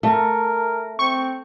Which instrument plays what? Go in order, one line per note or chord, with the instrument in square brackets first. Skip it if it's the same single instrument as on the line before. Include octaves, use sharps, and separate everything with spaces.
[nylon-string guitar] A3 [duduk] A#4
[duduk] C4 [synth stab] C#6